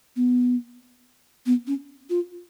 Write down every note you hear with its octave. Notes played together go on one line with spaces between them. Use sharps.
B3
B3
C#4
F4